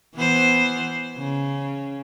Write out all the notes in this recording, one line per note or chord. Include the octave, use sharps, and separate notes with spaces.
E3 B3 C5
C#3